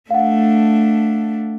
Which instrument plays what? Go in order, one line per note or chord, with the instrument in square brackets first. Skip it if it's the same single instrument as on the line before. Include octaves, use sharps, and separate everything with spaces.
[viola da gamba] A3 D4 [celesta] F5 F#5